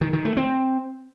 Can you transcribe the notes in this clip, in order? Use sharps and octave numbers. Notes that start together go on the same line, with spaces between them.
D#3
D#3
A3
C4